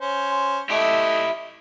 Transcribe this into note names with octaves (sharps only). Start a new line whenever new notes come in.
C#4 C5
A3 E4 G4 D#5